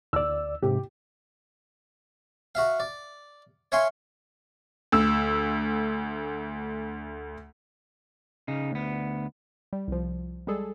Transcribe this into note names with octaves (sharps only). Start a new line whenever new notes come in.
D2 D5 E6
G#2 C3 G4
F#4 E5 F5
D5
C#5 E5 F5 G#5 C6 C#6
D2 E6
C#3 D#4
D2 B3
G3
C2 F3
G3 G#3 G#4 A4